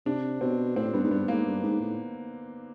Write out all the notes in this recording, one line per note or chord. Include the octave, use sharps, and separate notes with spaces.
C3 D4
B2 C4
A2 C4
G2 B3
G#2
G2 B3
G#2 A#3
G2
G#2
A2